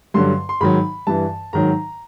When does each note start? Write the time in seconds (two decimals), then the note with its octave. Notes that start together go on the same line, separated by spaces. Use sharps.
0.14 G2 D3 F#3 C6
0.49 C6
0.61 G#2 D#3 F#3 B5
1.07 G2 E3 A5
1.53 G#2 D#3 F#3 A#5